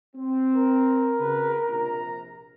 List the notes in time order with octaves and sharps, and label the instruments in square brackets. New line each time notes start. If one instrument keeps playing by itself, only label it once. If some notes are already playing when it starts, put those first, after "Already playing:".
[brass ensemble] C4
[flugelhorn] A#4
[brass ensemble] C#3 F#4 B4
A#1 C3 A#5